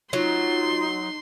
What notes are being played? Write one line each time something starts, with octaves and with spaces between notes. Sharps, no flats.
F#3 D#4 F4 C6